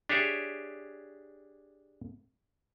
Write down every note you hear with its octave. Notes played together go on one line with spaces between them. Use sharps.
D4 G4 G#4 C#5 E5